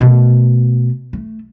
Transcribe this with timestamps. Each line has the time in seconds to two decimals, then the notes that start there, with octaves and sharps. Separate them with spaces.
0.01 B2 A3
1.13 A3